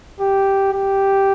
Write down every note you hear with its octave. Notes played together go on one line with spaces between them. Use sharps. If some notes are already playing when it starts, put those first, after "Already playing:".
G4
G4